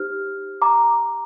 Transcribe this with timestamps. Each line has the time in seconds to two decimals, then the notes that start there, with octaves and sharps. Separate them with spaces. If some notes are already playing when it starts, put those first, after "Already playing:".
Already playing: D#4 G4 C5 F6
0.62 A#5 D6